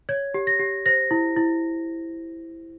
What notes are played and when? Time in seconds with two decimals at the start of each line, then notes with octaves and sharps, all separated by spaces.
0.09 C#5 G#6
0.34 G4
0.47 A#6
0.59 G4
0.86 C5 A#6
1.11 E4
1.36 E4